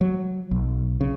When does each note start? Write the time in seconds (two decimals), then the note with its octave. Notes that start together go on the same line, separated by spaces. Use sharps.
0.01 F#3
0.51 B1
1.01 C#3